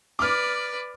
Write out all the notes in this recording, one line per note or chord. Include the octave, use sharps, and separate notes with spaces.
B4 D5 D6 F6